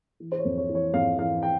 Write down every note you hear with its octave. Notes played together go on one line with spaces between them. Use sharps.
E3
C5
C#5
F2
C#5
E3
C#5
F2 F5
E3 F5
G5